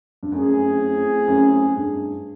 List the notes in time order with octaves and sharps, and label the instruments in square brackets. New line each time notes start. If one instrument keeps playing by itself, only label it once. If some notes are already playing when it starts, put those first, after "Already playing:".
[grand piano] G2
[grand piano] F#2 [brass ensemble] A3 C4 E4 G#4
[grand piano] F#2
G2